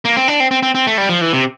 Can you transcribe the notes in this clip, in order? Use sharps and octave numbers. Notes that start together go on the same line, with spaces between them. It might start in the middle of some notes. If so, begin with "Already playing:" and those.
A#3
C4
D4
C4
C4
C4
C4
A3
G3
F3
E3
C3